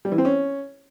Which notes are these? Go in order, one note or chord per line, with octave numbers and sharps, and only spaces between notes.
G3
E3
C4
C#4